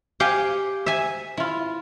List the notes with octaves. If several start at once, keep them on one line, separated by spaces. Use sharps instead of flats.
G4 F5 G5 G#5
E5 G#5
E4 F4